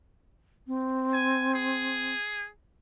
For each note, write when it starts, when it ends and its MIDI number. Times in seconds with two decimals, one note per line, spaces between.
0.67 2.14 60
1.14 1.53 80
1.54 2.49 68